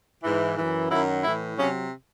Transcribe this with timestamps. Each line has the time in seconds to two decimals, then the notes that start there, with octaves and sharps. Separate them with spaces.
0.23 G#2 E3
0.57 F#2 E3
0.90 F#2 D#3 F#3 E4
1.23 A2 E3 E4
1.57 C3 F#3 C#4